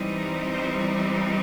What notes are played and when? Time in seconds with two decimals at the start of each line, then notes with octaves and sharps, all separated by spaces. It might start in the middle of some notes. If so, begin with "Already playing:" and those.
Already playing: E3 G3 C4 D#4
0.51 C5